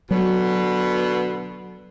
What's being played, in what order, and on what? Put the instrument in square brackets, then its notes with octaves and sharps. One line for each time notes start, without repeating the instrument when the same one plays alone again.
[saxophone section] B2 D3 B3 [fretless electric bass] F#3